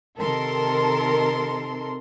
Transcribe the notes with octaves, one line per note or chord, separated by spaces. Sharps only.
C3 D#3 A4 A#4 C6